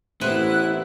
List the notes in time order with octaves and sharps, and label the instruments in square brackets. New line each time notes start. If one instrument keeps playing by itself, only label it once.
[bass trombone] A1 [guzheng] B3 C4 B4 [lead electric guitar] E4 [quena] F#6